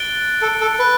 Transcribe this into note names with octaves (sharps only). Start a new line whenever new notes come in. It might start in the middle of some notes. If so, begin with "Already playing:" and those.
Already playing: F#6 A6 D7 G7
A4
A4
B4